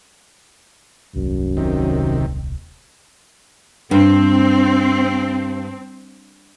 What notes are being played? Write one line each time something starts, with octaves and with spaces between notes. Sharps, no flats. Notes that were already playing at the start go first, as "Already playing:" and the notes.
D#1 C2 F#2
C3 D#3
G2 C4